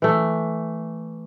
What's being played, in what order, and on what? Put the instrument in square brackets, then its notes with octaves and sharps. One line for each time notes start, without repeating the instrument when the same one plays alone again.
[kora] E3 A3